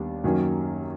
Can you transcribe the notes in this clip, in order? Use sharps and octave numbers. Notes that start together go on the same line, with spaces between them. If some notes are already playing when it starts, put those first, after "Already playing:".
Already playing: D#2 G3 B3 D4
F#2 D#3 F#3 A#3 C#4